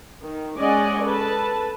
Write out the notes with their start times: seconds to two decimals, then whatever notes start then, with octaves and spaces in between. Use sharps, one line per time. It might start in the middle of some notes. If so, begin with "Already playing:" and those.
0.23 D#3
0.59 G#3 C#4 D5 D#5 F#5 G#5
1.04 A4 B4 A5